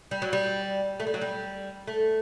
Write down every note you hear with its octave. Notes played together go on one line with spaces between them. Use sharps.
G3
F#3
G3
A3
G3
F#3
G3
A3